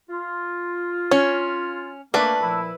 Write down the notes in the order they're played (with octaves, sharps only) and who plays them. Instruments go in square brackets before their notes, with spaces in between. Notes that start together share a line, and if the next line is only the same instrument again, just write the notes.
[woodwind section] F4
[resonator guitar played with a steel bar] C#4 [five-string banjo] C#5
[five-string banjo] A3 D4 D5 [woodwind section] A#3 [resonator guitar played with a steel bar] B4
[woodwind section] A#2 F3 E4